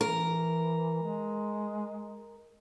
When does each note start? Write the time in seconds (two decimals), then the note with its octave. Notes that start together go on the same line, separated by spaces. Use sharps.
0.01 E3 A#4
1.02 G#3